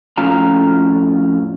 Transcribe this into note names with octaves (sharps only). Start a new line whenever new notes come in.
F2 A2 C#4 F4 F5 A#5